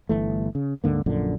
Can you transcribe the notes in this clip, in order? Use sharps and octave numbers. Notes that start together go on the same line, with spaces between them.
G1 E3 A3
C#3
D2 G#2 D3 A#3
A#1 F#2 A#2 D3